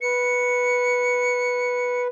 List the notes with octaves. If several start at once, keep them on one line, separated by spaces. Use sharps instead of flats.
B4 C#7